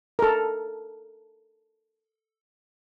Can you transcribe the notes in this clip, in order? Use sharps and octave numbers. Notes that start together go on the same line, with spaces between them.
A4 A#4